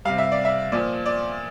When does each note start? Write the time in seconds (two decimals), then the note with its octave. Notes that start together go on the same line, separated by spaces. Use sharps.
0.05 C3 G3 F5
0.18 E5
0.32 D5
0.45 E5
0.72 A#2 F3 D5
1.06 D5